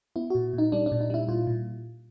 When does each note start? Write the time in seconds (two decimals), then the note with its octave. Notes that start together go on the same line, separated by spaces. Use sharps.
0.16 B3 E4
0.30 A#2 F#4
0.54 A#2 D#4
0.72 G3 D4
0.86 D4
0.92 A#2
1.01 D#4
1.10 G3 E4
1.28 A#2 F4
1.47 A#2